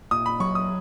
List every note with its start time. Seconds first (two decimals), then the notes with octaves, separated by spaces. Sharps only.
0.11 A#2 D#6
0.26 B5
0.40 F#3 C#6
0.55 D#6